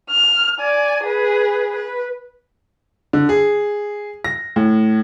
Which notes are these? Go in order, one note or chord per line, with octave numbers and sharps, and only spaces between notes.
F6
D5 G#5
G#4 B4
B4
D3
G#4
A#6
A2